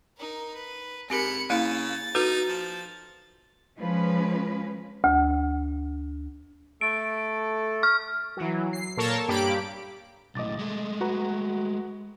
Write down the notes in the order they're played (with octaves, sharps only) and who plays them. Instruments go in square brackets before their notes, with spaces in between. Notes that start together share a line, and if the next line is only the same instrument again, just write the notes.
[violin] D#4 A#4
B4
[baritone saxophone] G#2 [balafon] C4 G4 A#4 [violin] B5 C#7
[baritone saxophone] C#3 [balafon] A#3 E4 F5 [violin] A6
[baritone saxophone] D#4 [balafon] F#4 A4 B4
[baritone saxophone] F3
[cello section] F3 G#3 C#4 B4
[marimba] D2
[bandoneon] A3 A4 [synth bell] D7
[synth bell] C#6 F6
[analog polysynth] E3 F#3
C7
A#2 A4 A#4 C#5 A5
G2 A#3 G4 B5 D6 D7
[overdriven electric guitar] B1 A2 [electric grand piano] D#5 D6 A6
[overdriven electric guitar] G#3 A3
[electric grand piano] F#4 B4 A#5